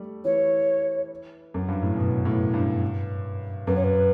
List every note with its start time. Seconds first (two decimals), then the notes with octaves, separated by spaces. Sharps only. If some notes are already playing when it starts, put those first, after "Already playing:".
Already playing: G3 A3
0.24 E3 C#5
1.54 F#2
1.68 G2
1.83 A2
1.96 B2
2.25 A2
2.54 G2
3.67 F#2 B4
3.76 C#5
3.84 B4